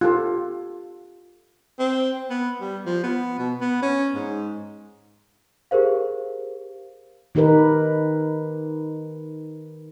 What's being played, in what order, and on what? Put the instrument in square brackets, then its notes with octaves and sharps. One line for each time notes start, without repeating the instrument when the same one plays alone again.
[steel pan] F4 G4 A4
[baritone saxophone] C4
B3
G3
F3
B3
B2
B3
C#4
G#2
[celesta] G4 G#4 A#4 C5 F5
[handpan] D#3 D#4 G4 A#4 B4